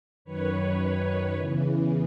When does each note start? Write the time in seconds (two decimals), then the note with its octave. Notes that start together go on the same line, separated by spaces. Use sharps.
0.25 F#2 D#3 B4 C#5
1.37 E2 C#3 E3